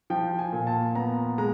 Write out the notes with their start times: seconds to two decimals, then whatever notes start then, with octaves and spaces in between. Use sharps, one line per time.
0.10 F3 G5
0.39 G#5
0.53 A#2
0.67 A5
0.95 B3 A#5
1.38 G#3 A#5